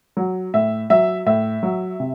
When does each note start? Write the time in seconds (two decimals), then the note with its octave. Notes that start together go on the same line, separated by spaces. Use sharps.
0.17 F#3
0.54 A2 E5
0.90 F#3 E5
1.26 A2 E5
1.63 F#3
2.00 C3